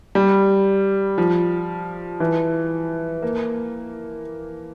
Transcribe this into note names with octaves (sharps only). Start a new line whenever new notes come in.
G3
F3
E3
A#3